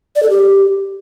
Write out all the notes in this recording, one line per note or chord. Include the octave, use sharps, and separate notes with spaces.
D5
A4
G4